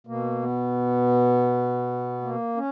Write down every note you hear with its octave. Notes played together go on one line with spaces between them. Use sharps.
B2 A#3
B3
A#3
C#4